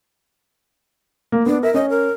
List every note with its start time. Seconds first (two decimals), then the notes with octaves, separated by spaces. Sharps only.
1.32 A#3
1.46 B3 D4
1.63 A#4 E5
1.74 C#4 D#5
1.90 A#4